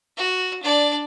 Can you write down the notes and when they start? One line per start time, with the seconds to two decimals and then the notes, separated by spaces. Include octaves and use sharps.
0.17 F#4
0.63 D4 D5